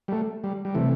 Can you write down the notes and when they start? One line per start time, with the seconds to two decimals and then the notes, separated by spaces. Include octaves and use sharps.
0.08 G3
0.12 A3
0.44 G3
0.65 G3
0.75 C3 E3 A3